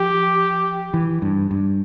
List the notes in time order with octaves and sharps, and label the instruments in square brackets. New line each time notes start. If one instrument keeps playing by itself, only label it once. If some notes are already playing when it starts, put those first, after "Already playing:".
Already playing: [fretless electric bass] F3 [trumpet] G4
[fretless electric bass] E3
G2
G2